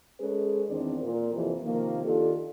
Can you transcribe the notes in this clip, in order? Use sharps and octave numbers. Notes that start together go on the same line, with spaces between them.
G#3 C#4 G#4 A4 B4
E2 D#3 C4 D4 D5
A#2 A#4
F2 C3 E3 F3
C3 D#3 F3 A#3
D#3 D4 F4 G4 A4